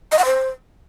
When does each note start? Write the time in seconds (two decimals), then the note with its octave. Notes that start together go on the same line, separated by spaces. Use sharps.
0.12 D#5
0.19 F#5
0.25 C5